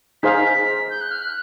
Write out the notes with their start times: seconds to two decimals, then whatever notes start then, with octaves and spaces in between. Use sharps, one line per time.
0.23 D#4 G#4 C5 F5 B6
0.90 G6
1.01 F#6
1.11 F6
1.22 F#6